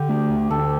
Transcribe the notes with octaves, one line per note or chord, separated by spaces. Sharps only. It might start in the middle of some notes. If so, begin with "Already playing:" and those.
Already playing: D3 G4
A3
D2
D2 A4